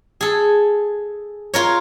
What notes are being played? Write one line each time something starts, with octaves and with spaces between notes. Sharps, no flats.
G#4 A4
F4 A#4 C#5